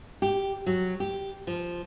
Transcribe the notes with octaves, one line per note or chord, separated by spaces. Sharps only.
G4
F#3
G4
F3